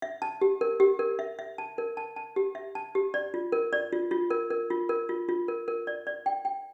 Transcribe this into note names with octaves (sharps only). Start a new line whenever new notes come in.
E5
A5
G4
A#4
G4
A#4
E5
E5
A5
A#4
A5
A5
G4
E5
A5
G4
D5
F4
A#4
D5
F4
F4
A#4
A#4
F4
A#4
F4
F4
A#4
A#4
D5
D5
G5
G5